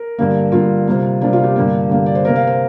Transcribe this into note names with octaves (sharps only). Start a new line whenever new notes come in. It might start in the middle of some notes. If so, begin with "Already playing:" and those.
Already playing: A#4
G2 D3 A#3
G2 D3 A#3 F4
C3 G3 A#3
C3 G3 A#3 D4
F4
G4
G2 D3 A#3
G2 D3 A#3
D5
C5
C3 A#3 A#4
F5
C5